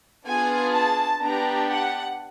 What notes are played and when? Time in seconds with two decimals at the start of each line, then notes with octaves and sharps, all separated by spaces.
0.25 B3 D4 F4 G#4 G#5
0.73 A5
1.20 B3 D4 G4 A#5
1.69 F#5